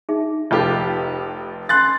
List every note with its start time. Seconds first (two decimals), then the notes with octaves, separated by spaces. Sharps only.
0.09 D#4 G#4 E5
0.51 F1 F4 G4
1.69 C6 F#6 A6